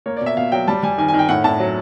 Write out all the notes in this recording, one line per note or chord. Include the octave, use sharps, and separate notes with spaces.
A#3 C#5
B2 D5
E5
B2 F5
F#3 G5
G3 A5
G3 G#5
D#3 G#5
G#5
D#3
G5
A2 F#5
A2 A5
F#3